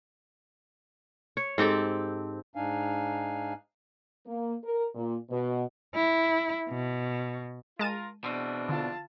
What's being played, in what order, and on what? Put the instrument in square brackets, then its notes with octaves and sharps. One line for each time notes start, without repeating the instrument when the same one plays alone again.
[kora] C#5
G#2 C4 G4 A4
[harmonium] G#2 D4 D#4 F5 G#5
[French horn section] A#3
A#4
A#2
B2
[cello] E4
B2
[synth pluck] G#3 A5 D#7 [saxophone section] F4 A#4
[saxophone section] E2 E3 D4 [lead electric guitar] B2 C4
[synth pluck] D3 [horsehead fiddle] F4 A5